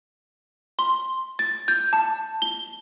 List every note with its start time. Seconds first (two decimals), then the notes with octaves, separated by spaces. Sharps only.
0.79 C6
1.39 A6
1.68 G6
1.93 A5
2.42 G7